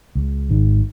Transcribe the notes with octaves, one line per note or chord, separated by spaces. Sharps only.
C#2
G#1 G#2 D#3